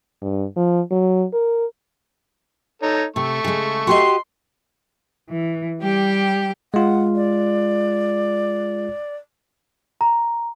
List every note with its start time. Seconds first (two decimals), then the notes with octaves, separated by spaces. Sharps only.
0.22 G2
0.57 F3
0.91 F#3
1.33 A#4
2.82 D#4 A4 C#5
3.16 C3 A3 C#6
3.44 C#3 G#3
3.87 F#4 G4 D#5 C6
5.30 E3
5.80 G3 G4 G5
6.74 G#3 F4 F#5
7.15 D5
10.01 A#5